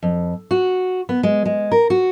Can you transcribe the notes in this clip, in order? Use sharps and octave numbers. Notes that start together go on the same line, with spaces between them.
F2
F#4
B3
G#3
G#3
A#4
F#4